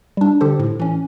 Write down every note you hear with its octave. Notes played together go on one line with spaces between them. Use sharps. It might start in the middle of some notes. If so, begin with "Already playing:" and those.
G3 D4
D3 G4 A4 C5
A2
E3 C#4